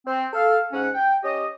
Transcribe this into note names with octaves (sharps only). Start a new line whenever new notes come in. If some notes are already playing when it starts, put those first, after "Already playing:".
C4
A4 F5
G#2 C#4 F#5
G5
C#4 G4 D#5